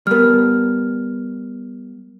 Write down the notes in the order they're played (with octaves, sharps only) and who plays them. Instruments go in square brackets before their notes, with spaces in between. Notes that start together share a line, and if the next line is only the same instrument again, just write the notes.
[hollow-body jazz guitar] G3 B3 [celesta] A#4 F6